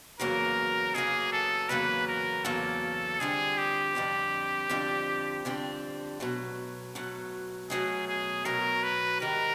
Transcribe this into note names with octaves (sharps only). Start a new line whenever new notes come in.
E2 C#3 F#3 A#3 A#4
E2 C#3 F#3 A#3 G#4
A4
E2 C#3 F#3 A#3 B4
A#4
E2 C#3 F#3 A#3 A4
F2 D3 G3 C4 G#4
G4
F2 D3 G3 C4
F2 D3 G3 C4
F2 D3 G3 C4
B2 F#3 A3
B2 F#3 A3
B2 F#3 A3 G#4
G#4
B2 F#3 A3 A#4
B4
G#2 D#3 G3 A#4